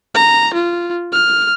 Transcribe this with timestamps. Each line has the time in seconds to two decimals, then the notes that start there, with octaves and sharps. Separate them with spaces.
0.15 A#5
0.54 F4
1.12 F6